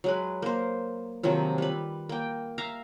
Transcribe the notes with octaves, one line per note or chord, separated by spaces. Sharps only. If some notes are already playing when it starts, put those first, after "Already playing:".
F#3 G#3 B4
A#3 C5
C3 D#3 F3 F#3
G3 B4
A#3 G5
E5 F5 A#5